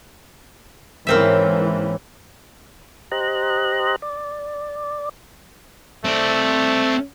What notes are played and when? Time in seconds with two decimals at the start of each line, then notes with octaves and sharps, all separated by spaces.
1.07 G#2 C#3 E3 A#3 C4 E5
3.11 G4 C5 D#5 A#5 F#6
4.02 D5
6.05 A3 C4 D5